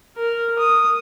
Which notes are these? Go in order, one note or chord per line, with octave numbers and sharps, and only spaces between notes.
A#4
D#6